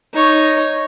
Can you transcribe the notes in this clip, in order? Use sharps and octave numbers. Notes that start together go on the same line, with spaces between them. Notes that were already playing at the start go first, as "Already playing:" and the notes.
D#4 C#5